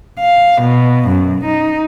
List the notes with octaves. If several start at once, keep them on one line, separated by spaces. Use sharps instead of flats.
F5
B2
F#2
D#4